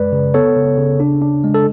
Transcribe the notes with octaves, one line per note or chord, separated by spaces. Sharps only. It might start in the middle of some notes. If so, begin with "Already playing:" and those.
Already playing: F#2 G#3 B4 D5
C#3
B3 A4 C#5
C#3
C#3
D4
D4
G#3
A4